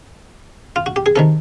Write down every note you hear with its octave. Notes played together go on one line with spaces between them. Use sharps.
F4
F#4
G4
G#4
C3 D#3 A4